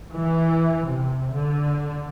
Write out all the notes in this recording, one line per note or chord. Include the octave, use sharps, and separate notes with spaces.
E3
C3
D3